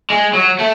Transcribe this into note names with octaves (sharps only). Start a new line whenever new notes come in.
G#3
F#3
A3